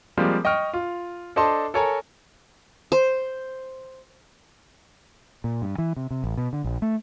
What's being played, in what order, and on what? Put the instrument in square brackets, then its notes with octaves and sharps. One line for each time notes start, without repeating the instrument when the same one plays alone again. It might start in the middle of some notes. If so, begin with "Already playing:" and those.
[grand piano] F3 G3 G#3 A#3 C4
D#5 G5 C#6 F6
F4
D4 A4 C5 D#5 A5 C6
A4 A#4 C#5 G#5 A#5
[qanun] C5
[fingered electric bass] A#2
G2
E3
C3
C3
A1
B2
D3
A#1
A3